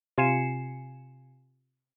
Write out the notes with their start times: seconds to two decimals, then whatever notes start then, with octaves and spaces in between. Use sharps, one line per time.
0.18 C3 F4 G#5 C7 C#7 E7